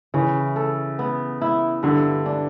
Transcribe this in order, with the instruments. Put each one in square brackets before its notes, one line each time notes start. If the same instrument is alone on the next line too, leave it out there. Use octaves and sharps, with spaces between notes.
[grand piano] C#3 [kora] E3
[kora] A4
B3
E4
[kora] G2 [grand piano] D3
[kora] D4